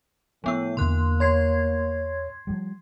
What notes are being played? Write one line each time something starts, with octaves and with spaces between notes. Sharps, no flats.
A2 F3 B3 E6
E2 D3 E3 A#3 C6 F#6
C#5 C6 G#6 C7
F3 G3